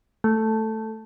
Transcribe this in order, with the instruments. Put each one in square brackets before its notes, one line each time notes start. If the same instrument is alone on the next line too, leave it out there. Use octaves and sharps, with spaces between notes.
[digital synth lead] A3